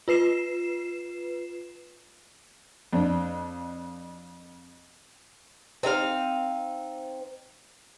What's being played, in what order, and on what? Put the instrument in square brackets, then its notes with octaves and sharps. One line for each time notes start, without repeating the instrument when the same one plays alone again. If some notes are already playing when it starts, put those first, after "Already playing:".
[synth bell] F4 B4 C7 E7
[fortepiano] F2 D4
[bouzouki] C4 D#4 G#4 F5